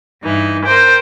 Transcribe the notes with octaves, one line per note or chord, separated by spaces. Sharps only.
G2 E3 D#4
A#4 C5 G5